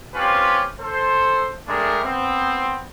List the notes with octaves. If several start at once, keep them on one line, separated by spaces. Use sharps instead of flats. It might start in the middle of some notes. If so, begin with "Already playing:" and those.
C4 C#4 F4 G4 B4
A4 C5
G#3 A3 D4 G4 A#4
B3 C4